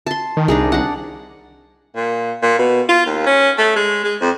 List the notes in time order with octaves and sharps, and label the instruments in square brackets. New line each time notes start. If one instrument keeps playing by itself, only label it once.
[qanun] A5 C6
[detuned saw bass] D#3
[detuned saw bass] C2 [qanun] D4 D#4 G#4
[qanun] D4 F#5
[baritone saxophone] A#2
A#2
B2
F4
D#2
C#4
A3
G#3
G#3
F2